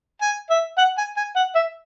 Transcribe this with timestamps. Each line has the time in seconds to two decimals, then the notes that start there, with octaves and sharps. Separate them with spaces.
0.22 G#5
0.50 E5
0.78 F#5
0.98 G#5
1.17 G#5
1.36 F#5
1.55 E5